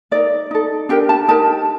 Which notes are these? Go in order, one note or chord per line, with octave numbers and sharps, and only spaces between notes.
D#4 A#4 D5
D#4 A4
D4 G4 A#4 G5
A5
D#4 G4 A#4 A5